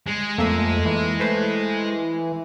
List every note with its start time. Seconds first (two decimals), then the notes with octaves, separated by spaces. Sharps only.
0.07 G#3
0.38 F2 A3 A#3 E5
0.85 E3
1.20 A3 B4 C5